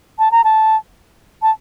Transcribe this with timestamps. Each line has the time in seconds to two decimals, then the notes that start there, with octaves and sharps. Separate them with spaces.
0.19 A5
0.32 A#5
0.44 A5
1.42 A5